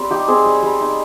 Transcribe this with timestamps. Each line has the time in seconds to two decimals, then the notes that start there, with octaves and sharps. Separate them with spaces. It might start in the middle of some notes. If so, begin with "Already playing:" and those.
Already playing: G3 C4
0.10 D#4 G4
0.28 C4 G#4
0.46 G3
0.63 G3
0.81 D#4